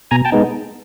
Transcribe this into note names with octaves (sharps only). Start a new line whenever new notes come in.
B2 G#5 A#5
G5 A5
G#3 B3 D#4